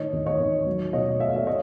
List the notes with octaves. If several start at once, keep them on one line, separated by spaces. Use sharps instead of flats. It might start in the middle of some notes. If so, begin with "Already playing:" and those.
Already playing: A2 D#3 C#5 D#5
D#2
C#5 D#5
D#2
F#3
B2 C#5 D#5
A3 E5
F5
D5 E5
C#5 D#5